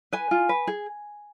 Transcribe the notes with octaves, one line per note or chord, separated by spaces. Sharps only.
B4 G#5
F4
B4
G#4